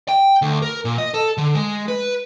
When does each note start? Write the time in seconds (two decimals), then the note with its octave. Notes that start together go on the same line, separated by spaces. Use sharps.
0.09 G5
0.42 D2
0.62 A#4
0.85 A#2
0.98 D#5
1.14 A4
1.38 D3
1.55 G#3
1.88 B4